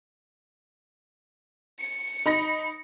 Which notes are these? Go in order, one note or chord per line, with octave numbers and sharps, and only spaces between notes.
C#7
D#4 B5 A#6